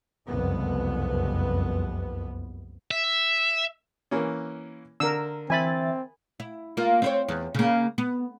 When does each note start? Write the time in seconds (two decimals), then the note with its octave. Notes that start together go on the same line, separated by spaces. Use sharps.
0.28 F#1 C2 F2 B3
2.91 E5
4.11 E3 A#3 C#4
5.00 D3 A#4 E6
5.50 E3 C4 E5 G#5 B5 A6
6.40 E4
6.77 A#3 F4
7.02 C4 C5 C#5
7.28 E2
7.54 C#3 A#3
7.98 B3